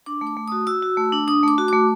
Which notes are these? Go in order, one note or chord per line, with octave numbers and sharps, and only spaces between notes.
D4 D6
A3
D6
A3
F#4 D#6
F#4 E6
F#4
A3
D4
D4 D#6
A3 D6
F#4
A3 D6